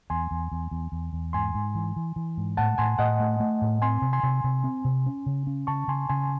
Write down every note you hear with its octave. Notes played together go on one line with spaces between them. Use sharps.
E2 G#5 C6
E2
E2
E2
E2
E2
G#2 G#5 C6
G#2
E3
E3
E3
G#2
A2 F#5 A5
A2 G#5 C6
A2 D#5 F#5
A3
A3
A2
C4 G#5 C6
C3
G#5 C6
C3
C3
C4
C3
C#4
C#3
C#4
C#3 A5 C#6
C#3 G#5 C6
C#3 G#5 C6